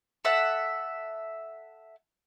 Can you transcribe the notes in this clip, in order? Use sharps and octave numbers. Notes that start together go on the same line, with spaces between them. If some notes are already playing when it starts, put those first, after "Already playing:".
A4 E5 F#5